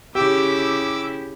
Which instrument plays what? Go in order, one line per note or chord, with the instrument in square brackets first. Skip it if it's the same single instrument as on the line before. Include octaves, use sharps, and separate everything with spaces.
[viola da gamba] C#3 E4 [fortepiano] G4 [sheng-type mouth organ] D6 E6